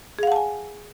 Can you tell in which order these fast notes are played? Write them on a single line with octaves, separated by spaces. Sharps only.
G#4 F5 F#5 A5 G#5